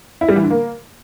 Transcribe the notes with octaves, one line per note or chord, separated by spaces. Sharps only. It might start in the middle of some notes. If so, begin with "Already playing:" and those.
E4
G3
E3
D3
A#3